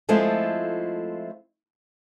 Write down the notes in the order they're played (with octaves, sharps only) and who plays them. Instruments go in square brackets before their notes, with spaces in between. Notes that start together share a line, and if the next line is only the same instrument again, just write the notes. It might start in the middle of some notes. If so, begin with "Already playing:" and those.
[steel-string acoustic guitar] F3 G#3 A3 C4 E4 F4